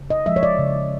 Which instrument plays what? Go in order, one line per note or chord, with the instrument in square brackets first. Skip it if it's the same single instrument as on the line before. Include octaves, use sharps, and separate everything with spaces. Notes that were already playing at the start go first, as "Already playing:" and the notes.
Already playing: [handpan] C#3
D#5
F3 G#3 E5
C#5
D5
C#3